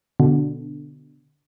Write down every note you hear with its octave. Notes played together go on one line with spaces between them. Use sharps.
B2 D3